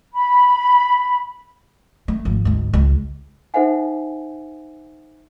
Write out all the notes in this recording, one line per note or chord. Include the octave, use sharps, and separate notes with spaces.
B5
A3
G#1 F3
D2 G#2
C#2 G#3
D#4 A4 C5 E5 F#5 G#5